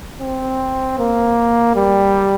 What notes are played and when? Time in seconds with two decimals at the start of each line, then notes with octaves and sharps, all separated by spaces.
0.21 C4
0.98 A#3
1.76 G3